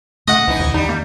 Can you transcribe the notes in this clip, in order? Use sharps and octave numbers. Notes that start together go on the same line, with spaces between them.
A#2 C#3 A3 D#5 F#5
C#2 E3 D#4
D#2
E2 D#3 G3 C#4 D#4
A#3